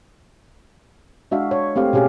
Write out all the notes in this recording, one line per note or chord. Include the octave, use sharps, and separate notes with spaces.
G#3 D4 F#4 E5 F5
C#5
A3 C4 G4 F5
B2 C#4 G4 G#4 F5